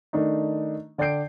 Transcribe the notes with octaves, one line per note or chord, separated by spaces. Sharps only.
D#3 A3 D4 D#4
D3 D5 G5 G6 C7 D7